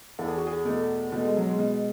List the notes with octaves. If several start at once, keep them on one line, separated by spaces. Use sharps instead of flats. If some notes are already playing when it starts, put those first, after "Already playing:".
E2 A4
G#4
F#4
G#4
B2 A3
B2 A3
G#3
F#3
G#3
B2